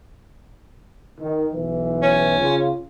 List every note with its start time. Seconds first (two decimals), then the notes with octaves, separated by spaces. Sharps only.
1.21 D#3
1.53 B1 E3
2.02 C#4
2.40 C#3 F4